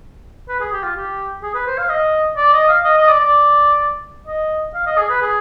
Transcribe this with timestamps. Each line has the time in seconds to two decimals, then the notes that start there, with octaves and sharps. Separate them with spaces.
0.49 B4
0.60 G#4
0.72 G4
0.83 F4
0.96 G4
1.42 G#4
1.54 B4
1.67 C5
1.78 F5
1.89 D#5
2.37 D5
2.53 D#5
2.68 F5
2.85 D#5
2.97 D#5
3.08 D5
3.20 D5
4.27 D#5
4.74 F5
4.87 D#5
4.98 G#4
5.10 B4
5.22 G#4